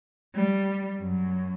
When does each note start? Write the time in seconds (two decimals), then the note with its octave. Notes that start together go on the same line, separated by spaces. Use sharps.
0.35 G3
1.00 F#2